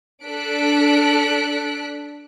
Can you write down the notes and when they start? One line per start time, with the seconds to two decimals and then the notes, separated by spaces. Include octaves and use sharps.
0.25 D4 A4 F#6 B6 D7